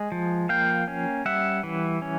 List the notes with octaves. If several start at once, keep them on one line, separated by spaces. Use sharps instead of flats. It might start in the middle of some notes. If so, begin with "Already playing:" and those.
Already playing: G#3
F3
A#3 F5 G5
C#4
G3 E5 F#5
E3
C#4